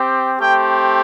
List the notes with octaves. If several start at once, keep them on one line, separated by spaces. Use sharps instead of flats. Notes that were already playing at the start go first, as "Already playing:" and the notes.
Already playing: C4 G4
A3 C4 G4 G5